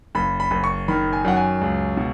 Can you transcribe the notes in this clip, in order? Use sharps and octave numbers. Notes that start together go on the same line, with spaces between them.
F#1 B5
B5
F#1
C#6
D#3 B5
G#5
F#2 F#5
G#5
C#2
B2